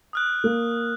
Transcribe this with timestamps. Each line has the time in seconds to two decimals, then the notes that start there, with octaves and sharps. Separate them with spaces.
0.13 D#6 F6 F#6
0.44 A#3